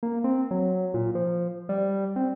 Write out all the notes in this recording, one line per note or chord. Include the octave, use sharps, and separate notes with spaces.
A#3
C4
F#3
A#2
F3
G3
C4